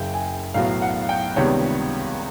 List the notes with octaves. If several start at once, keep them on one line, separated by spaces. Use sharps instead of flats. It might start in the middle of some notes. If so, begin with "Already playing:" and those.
Already playing: F#1 F#2 C#3 G5
G#5
B1 A2 F#3 B3 F5
F#5
G5
C#2 C3 D#3 G3 B3 C#5